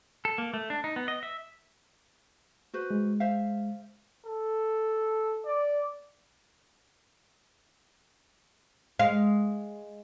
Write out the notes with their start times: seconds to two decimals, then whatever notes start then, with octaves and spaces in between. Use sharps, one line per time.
0.25 A4
0.38 A#3
0.54 A3
0.70 D4
0.84 D#4
0.96 B3
1.08 D#5
1.23 E5
2.74 F#4 B4 C5
2.91 G#3
3.20 C5 E5 F5
4.26 A4
5.45 D5
8.99 G#3 F5